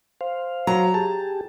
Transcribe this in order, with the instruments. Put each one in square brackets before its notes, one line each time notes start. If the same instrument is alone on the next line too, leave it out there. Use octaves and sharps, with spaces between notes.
[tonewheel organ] C5 F5
[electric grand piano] F#3 [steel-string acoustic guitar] A#5
[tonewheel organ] G4 G#4 [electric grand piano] A5